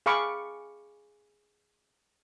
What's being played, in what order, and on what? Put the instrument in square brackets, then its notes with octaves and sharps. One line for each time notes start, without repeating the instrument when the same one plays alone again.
[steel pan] G#4 F5 B5 C#6 D6